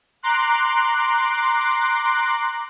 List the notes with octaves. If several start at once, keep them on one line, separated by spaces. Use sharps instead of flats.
A#5 C6 D6 F#6